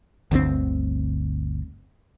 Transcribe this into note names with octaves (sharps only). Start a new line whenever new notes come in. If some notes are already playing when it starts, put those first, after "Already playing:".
G1 D2 C#3 C4